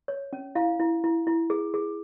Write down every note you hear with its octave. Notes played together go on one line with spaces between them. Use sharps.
C#5
C#4
E4 F5
E4
E4
E4
G#4
G#4